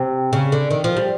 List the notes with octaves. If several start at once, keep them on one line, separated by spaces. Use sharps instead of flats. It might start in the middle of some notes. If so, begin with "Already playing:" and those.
Already playing: C3
C#3
D3
D#3
F3
G3